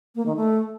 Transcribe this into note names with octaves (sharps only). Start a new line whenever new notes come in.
A#3
D#3
A3